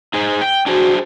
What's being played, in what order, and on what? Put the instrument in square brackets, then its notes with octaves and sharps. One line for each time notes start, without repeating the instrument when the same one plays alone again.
[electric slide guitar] D#4 G#4 C5
G5
[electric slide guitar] D4 G#4 C5 [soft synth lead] F#4